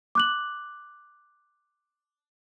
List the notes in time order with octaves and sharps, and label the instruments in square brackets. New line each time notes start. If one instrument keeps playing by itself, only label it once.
[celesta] D6 F#6 F#7